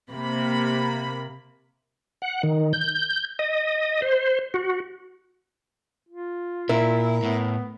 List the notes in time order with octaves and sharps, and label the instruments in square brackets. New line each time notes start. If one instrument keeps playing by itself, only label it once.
[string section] C3 A#3 B5
[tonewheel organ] F#5
D#3
G6
D#5
C5
F#4
[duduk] F4
[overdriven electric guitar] A#2 [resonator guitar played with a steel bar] E4 [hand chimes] A#4
[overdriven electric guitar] A2 [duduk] B3